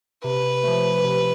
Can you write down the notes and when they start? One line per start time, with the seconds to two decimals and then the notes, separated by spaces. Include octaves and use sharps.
0.24 C3 B4
0.63 F3 A3
1.04 C3